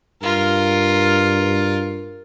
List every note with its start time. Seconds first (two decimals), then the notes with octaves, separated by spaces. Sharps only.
0.22 G2 F4 A#4